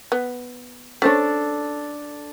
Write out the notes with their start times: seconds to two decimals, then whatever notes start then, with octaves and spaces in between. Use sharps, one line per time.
0.12 B3
1.02 C#4 D4 A4 C5 C#5